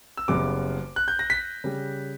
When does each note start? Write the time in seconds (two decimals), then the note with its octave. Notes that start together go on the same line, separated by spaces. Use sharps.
0.17 E6
0.28 F#1 F#2 C#3 G3 B3 D6
0.96 F#6
1.08 G6
1.19 A#6
1.30 B6
1.64 C#3 G3